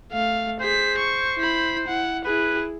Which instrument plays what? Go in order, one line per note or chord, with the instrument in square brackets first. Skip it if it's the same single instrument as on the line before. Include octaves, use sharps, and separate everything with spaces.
[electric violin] A3 F5
[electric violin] G#4 B6 [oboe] C5
[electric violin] C#6
E4 B5
E4 F#5
[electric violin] E4 G#4 [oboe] B4